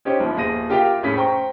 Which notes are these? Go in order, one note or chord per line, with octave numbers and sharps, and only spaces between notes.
C#4 D#4 G4 C5 C#5
G1 F3
D#1 G#4 A#6 D#7
F4 G4 A#4 E5 F5 G5
F1 A2 C#4 G#4 B6
C5 G5 A#5 C#6